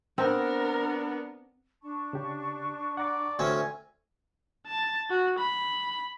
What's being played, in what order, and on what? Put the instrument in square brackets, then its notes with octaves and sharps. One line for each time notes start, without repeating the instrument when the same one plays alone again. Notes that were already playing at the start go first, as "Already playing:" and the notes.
[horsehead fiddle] B3 D4 [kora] C4 [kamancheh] A#4
[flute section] D4 A5 C#6
[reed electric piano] C#3 G4
[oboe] D5 [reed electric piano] F#5 A#5 D6
[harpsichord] D2 C4 C#4 [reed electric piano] E5 [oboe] G#5
[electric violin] A5
F#4
B5